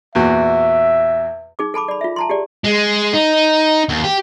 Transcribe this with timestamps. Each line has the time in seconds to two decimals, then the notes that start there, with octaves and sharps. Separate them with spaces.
0.15 E2 A#2 F#4 E5
1.59 D#4 G#4 D6
1.74 A4 A5 B5 D6
1.88 D5 B5
2.01 F4 E5
2.16 A5 A#5 C6
2.29 G4 G#4 D5
2.64 G#3
3.14 D#4
3.89 D#2
4.04 G4